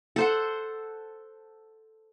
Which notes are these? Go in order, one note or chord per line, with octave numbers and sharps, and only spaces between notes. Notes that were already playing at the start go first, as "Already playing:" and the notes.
A4 C5 F#5